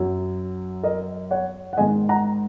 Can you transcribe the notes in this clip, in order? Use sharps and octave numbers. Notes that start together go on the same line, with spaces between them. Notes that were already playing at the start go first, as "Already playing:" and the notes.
Already playing: F#2 F#3
A#4 D#5
C#5 F#5
F#5
G#2 D#3 G#3 D#5 G#5
F#5 A#5